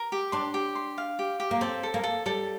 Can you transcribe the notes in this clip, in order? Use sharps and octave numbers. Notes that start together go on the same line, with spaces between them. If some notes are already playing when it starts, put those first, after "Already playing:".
Already playing: A#4
G4
D4 C6
G4
C6
F5
G4
G4
A#3
C4 A4
A4
A#3
A4
G3 A4